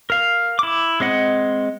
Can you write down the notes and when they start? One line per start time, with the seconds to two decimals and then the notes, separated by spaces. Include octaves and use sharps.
0.10 A#4 F5
0.59 E4 D6
1.00 G#3 C4 D#5 F#5